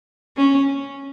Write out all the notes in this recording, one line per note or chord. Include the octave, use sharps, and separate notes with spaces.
C#4